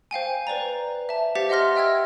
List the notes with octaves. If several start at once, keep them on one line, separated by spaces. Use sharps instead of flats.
C5 F5 G5 G#5
B4 C5 D5 A#5
E5 A5
G4 C5 F5 F#5 A6 B6
D#5 E5 F#5 C6 F6 A#6
D#5 E5 G5 E6 F6 G#6